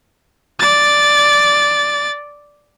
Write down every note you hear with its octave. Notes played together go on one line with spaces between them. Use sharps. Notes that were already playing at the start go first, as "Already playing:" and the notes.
D5 A6